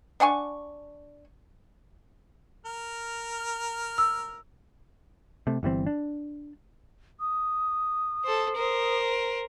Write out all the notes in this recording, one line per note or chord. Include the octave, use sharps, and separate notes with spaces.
D4 F#5 G#5 C#6
A#4 F6
E6
C3 A3
G1 E3 G3 C4
D4
D#6
A4 C5
A#4 C5